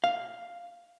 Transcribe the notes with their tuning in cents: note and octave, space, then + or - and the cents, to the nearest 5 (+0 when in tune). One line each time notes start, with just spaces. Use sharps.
F5 +0